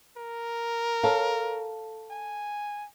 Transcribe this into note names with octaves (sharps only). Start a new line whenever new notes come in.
A#4
A4 C#5 F5
G#5